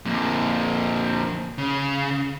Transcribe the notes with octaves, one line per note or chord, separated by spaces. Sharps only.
F2 A#2
C#3